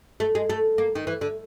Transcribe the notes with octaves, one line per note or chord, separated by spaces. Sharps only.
A3
G#3
A3
A#3
D#3
E3
D3